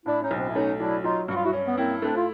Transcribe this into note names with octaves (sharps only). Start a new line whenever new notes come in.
A2 D4 E4
C#4 D#4
B1
C4 D4
E4
A3 C#4 D#4
F#3 D4 E4
F#3 D#4 F4
G2 F#4
F4
E4 F#4
C#4
B3
A#3 C4 E4
A3 C4 D4
F4